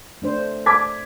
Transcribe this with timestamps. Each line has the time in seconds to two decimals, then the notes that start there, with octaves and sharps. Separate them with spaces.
0.22 A3 D4 C5
0.66 D6 G#6 B6